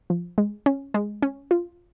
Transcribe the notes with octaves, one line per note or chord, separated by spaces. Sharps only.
F3
G#3
C#4
G#3
C#4
F4